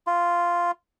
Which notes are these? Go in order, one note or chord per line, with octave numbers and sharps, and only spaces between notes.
F4